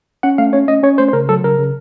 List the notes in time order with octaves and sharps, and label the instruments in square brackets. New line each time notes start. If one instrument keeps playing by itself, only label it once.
[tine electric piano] C#4 F#5
A3 F5
C#4 C#5
C#4 D#5
C#4 C#5
A3 C5
C5
C#3 A#4
F#3 A4
C#3 A#4
C#3